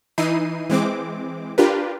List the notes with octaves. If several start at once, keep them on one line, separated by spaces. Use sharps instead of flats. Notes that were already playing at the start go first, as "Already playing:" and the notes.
E3 D#4 E4 C7 D#7
E3 G#3 C4 D6
D4 F4 G4 A#4 B4